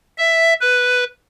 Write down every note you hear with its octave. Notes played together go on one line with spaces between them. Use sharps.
E5
B4